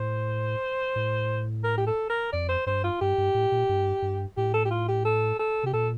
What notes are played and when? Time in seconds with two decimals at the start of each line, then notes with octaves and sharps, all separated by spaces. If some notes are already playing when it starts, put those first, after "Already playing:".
Already playing: A2 C5
0.96 A2
1.64 A#4
1.78 G4
1.87 A4
2.10 A#4
2.33 F2 D5
2.49 C5
2.66 G2 C5
2.84 F4
3.01 G2 G4
3.18 G2
3.34 A2
3.52 A#2
3.69 G2
4.02 G2
4.37 A2 G4
4.54 A4
4.65 G4
4.71 F4
4.88 G4
5.05 A4
5.39 A4
5.63 C3 G4
5.73 A#2 A4